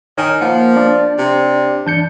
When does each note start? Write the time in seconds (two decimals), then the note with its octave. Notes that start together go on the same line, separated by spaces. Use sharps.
0.18 D#3 C#5 G#5
0.41 F3 A#3 F#5
0.77 D4 D5
1.18 C3
1.87 E3 D4 G6 C#7